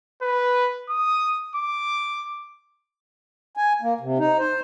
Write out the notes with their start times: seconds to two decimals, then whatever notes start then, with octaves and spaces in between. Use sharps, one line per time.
0.22 B4
0.90 D#6
1.55 D6
3.57 G#5
3.82 A#3
4.01 C3
4.18 D#4
4.38 C5